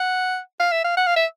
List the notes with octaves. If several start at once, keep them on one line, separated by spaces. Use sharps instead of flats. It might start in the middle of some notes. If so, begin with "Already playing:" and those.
Already playing: F#5
F5
E5
F5
F#5
F5
E5